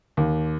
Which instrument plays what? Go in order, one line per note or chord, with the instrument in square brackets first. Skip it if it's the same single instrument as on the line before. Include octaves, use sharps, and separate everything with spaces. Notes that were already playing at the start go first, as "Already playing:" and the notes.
[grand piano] D#2